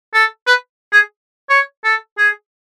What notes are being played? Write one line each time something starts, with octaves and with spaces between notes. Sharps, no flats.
A4
B4
G#4
C#5
A4
G#4